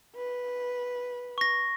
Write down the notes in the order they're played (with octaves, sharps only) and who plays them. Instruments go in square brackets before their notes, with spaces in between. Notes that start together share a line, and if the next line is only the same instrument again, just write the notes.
[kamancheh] B4
[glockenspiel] C#6 A#6